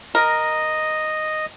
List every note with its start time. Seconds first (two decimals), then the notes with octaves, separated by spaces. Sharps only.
0.15 A#4 D#5